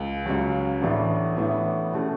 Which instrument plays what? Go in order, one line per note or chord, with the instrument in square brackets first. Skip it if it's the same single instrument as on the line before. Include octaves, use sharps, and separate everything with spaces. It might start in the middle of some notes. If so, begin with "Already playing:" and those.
Already playing: [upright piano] C#2
C#2 C#3 F#3
A1 A2 E3 B3 D4
A1 A2 E3 B3 D4
B2 A3 C#4